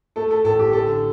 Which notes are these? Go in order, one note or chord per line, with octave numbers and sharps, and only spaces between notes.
A3 A4
A4
A1 A4
G4
D3 A4